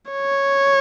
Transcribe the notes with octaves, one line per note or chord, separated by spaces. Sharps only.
C#5